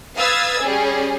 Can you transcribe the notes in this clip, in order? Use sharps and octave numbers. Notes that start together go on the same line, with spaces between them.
B4 F5 D#6 E6 G#6 A6
G3 C#4 G#4